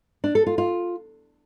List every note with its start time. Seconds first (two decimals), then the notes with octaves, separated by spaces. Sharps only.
0.24 D4
0.35 A4
0.46 F4
0.58 F4